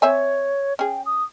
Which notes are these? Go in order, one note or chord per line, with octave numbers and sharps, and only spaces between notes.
C4 C#5 E5 G#5
C#4 G#4 G5
D#6